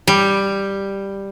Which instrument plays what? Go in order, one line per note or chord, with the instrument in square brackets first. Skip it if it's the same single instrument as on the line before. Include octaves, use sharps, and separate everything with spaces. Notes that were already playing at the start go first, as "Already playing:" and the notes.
[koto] G3